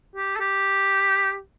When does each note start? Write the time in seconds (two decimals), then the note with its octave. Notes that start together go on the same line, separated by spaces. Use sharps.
0.15 G4
0.36 A4
0.40 G4